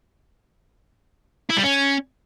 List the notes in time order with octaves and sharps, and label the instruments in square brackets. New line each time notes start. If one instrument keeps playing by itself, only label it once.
[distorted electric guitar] E4
G3
C#4